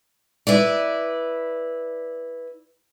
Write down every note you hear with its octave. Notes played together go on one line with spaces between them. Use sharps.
E4 B4 D5